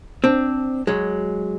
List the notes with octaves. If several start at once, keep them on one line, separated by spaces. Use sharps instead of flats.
C4 D4
F#3 G#3